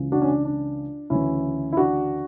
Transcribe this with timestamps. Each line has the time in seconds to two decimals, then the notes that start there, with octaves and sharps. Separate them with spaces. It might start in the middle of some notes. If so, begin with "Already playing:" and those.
Already playing: C#2 C#3 E3
0.12 D4 F#4
0.22 C#4
0.28 D4
0.45 D4
1.10 D2 C#3 E3 C#4 E4
1.72 E4
1.77 D4 F#4